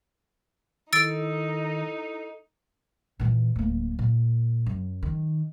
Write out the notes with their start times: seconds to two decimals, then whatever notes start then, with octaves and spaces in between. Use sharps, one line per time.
0.93 D#3 D#4 E4 A4 E6 A6 D7
3.20 A#2 E3
3.56 D1 A#3
3.99 A#2
4.66 F#2
5.03 D#3